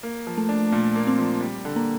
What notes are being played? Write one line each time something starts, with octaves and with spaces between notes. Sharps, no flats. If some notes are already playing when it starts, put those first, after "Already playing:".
A#3
F3
A3
D4
A#2
A#3
C4
F3
G3
D3
A#3